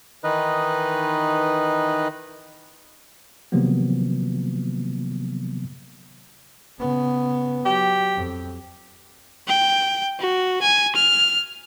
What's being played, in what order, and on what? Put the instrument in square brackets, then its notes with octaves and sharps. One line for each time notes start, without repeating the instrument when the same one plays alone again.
[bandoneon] D#3 E3 D#4 B4 D#5
[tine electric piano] C3 D#3 F3 F#3 A#3 B3
[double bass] C#3 B3
[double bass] F#3 [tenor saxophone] G4
[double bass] F2
[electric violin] G5
F#4
G#5
F6